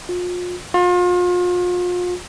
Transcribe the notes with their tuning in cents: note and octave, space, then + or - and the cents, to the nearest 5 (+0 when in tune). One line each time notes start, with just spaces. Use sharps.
F4 +35
F4 +35